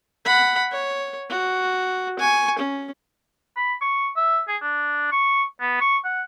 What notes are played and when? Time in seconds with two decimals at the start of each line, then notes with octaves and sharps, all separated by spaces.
0.25 F#5 B5
0.71 C#5
1.30 F#4
2.19 G#5 C#6
2.59 C#4
3.57 B5
3.81 C#6
4.16 E5
4.48 G#4
4.62 D4
5.12 C#6
5.61 B3
5.81 C#6
6.05 F#5